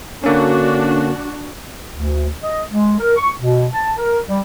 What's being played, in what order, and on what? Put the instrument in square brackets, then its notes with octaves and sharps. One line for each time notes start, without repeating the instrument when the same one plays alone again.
[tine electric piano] D3 A#3 C#4 [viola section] D4 F#4
[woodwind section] D2
D#5
G#3
A#4
C#6
B2
A5
A#4
G3